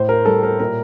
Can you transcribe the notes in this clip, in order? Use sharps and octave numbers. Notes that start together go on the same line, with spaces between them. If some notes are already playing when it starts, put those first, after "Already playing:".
Already playing: A2 C5
A#4
G3 A4
A#4
A#2 A#4